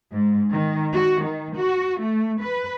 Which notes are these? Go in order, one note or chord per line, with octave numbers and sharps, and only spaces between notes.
G#2
D#3
F#4
D#3
F#4
A3
B4